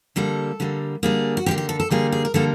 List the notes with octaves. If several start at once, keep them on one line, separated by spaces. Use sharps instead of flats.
D3 G3 A#3 A4
D3 G3 A#3
D3 G3 A#3 G#4
F#4
D3 G3 A#3 G4
G4
A4
A4
D3 G3 A#3 G#4
G#4
A#4
D3 G3 A#3 A4